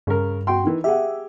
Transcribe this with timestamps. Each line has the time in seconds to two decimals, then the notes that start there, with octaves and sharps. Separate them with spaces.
0.07 G2 C#3 A#4
0.47 F#4 G5 C6
0.64 D#3 E3
0.84 G4 G#4 E5 F#5